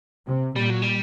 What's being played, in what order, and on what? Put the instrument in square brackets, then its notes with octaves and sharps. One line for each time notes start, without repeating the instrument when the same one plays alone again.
[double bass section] C3
[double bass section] A#2 [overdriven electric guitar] G3
[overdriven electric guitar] F#3
G3